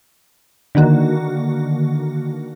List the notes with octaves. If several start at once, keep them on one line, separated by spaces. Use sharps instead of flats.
D3 D#3 A#3 F#4